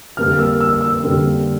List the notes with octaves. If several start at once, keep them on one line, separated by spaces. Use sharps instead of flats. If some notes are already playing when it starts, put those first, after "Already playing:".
F2 D3 G3 A#3 F6
E6
E6
E6
F2 D3 G3 A#3